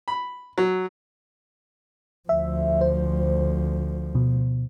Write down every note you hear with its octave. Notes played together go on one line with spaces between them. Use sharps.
B5
F#3
D2 F3 E5
C5
B2